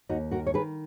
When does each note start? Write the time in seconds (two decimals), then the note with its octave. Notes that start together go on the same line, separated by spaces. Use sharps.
0.09 D#2 D#4 F#4
0.31 D#3 F#4 A#4
0.47 C#5
0.54 D#3 G#4 B4